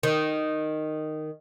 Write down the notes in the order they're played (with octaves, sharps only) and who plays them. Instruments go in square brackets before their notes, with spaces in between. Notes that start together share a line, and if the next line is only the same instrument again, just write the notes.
[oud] D#3